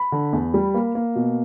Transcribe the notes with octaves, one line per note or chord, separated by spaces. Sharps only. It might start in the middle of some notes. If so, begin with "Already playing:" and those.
Already playing: B5
D3
E2
G3
A#3
A#3
B2